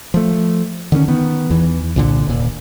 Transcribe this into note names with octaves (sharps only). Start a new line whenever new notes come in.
F3 A3
D3 D#3 C4 C#4
D#3 B3
E2 E3
C2 A#2 D3
D#1 A#2